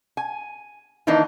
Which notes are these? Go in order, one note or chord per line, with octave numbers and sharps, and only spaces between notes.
G#5
D#3 E3 A#3 D4 D#4